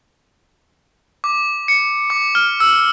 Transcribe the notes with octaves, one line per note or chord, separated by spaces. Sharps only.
D6
C#7
D6
F6
E6